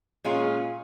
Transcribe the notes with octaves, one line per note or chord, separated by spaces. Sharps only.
A#2 G#3 C#4 F4 G#4